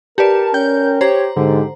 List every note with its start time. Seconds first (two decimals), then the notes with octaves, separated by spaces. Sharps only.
0.18 G4 A#4 B4 D5 A5
0.54 C#4 G5 G6
1.01 G4 C5 C#5 A#5
1.36 G#2 D3 G4